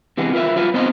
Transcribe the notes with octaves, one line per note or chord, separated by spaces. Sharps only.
C3 E3 G#3 B3
F4 A#4 B4 E5
F#3 F4 B4
B3 C4 D#4 C5 D#5